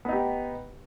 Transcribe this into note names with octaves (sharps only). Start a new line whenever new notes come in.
B3 D#4 G4